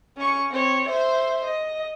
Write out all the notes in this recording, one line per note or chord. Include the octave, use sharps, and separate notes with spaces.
C#4 C#6
C4 C#5
C5 E5
D#5